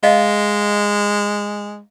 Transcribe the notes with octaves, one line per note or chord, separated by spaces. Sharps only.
G#3 D#5 F5